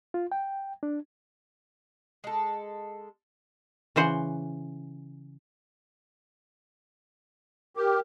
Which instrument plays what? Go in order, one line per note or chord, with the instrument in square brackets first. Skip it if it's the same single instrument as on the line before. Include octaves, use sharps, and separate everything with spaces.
[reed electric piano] F4
G5
D4
[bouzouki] G#3 A4
[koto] C#3 E3 C5 F#5
[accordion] G4 [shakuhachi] A#4